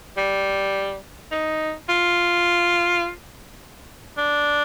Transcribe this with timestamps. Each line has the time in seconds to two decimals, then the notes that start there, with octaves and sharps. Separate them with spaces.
0.17 G3
1.32 D#4
1.89 F4
4.18 D4